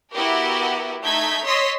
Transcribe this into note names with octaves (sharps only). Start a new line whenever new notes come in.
B3 E4 F#4 G4 A#4
A3 D#4 G6 G#6 B6
C#5 D#5 C6 E6 B6